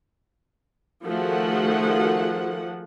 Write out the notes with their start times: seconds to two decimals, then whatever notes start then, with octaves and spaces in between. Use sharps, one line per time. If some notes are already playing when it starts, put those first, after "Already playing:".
1.04 D#3 F3 A3 F#4 G#4 F#5